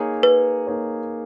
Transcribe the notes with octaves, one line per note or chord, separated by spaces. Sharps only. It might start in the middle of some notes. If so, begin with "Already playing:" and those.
Already playing: A#3 D#4 G#4 C#5
B4
A#3 D#4 G#4 C#5